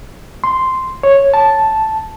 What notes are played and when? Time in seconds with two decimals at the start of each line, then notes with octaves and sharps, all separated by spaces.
0.44 C6
1.03 C#5
1.34 A5